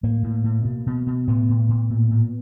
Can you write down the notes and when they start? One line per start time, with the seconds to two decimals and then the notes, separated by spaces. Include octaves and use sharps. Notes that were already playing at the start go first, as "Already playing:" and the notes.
0.03 A2 A#3
0.23 A2
0.44 A2
0.65 B2
0.86 B2
1.07 B2
1.27 A2 B3
1.49 A2
1.69 A2
1.90 A#2
2.11 A#2